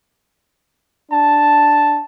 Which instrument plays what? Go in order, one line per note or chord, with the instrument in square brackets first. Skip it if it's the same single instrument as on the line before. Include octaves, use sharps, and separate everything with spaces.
[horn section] D4 A5